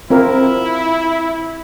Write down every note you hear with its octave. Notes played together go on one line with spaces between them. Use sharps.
C4 E4 F4 A#4